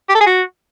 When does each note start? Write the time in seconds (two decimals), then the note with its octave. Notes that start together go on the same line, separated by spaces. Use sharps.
0.09 G4
0.15 A4
0.21 G#4
0.26 F#4